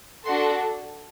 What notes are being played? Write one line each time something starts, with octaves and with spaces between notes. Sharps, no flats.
D4 F#4 A4 C6